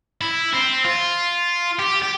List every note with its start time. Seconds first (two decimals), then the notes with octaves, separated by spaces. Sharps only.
0.21 E4
0.53 C4
0.85 F4
1.79 G4
2.02 G4